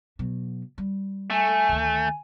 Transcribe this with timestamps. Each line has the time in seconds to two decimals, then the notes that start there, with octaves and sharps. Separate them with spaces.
0.19 B2 F#3
0.78 G3
1.30 A3 G#5
1.69 D2 D#3